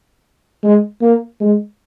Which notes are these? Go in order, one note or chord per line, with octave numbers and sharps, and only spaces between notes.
G#3
A#3
G#3